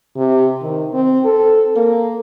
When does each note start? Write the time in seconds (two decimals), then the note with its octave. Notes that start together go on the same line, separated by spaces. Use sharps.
0.17 C3
0.61 D#3
0.93 C4
1.25 A4
1.76 A#3